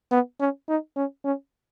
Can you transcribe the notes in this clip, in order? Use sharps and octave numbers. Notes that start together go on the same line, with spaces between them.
B3
C#4
D#4
C#4
C#4